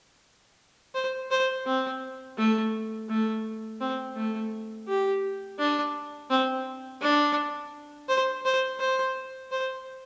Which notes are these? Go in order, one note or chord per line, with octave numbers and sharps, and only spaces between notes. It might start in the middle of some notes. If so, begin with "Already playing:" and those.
C5
C5
C4
A3
A3
C4
A3
G4
D4
C4
D4
C5
C5
C5
C5